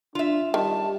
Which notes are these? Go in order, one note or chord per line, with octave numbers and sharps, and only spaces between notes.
D4 F4 E5
D#3 G3 A5